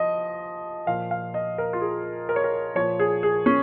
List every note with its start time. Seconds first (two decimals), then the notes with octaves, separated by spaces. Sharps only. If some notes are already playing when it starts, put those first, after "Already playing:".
Already playing: F3 D#5
0.87 A#2 F3 F5
1.11 F5
1.34 D#5
1.58 A#4
1.73 F4
1.81 G#4
2.29 A#4
2.36 C#5
2.44 A#4
2.75 A#2 F3 C#5
2.99 G#4
3.23 G#4
3.46 C#4